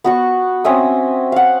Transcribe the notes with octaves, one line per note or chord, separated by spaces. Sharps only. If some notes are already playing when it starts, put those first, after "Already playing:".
B3 F#4 C#6
C4 C#4 E5 D#6
F5 F#5